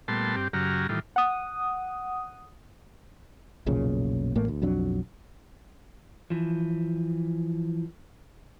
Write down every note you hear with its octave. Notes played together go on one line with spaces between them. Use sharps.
A#2 G3 A3 B3 A5 C6
G2 C4 G4
F#2 C#3 F#3 G4 A#5 F6
A2 D#3 E3 G3 F4
F#5 D#6
F1 B1 A#2 C#3
A1 A2 A3 A#3
D2
B1 F2 F#3 D4
E3 F3